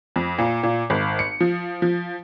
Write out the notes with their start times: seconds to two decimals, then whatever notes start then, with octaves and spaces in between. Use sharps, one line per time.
0.16 F2
0.39 A#2
0.63 A#2
0.90 G#1
1.19 C#7
1.40 F3
1.82 F3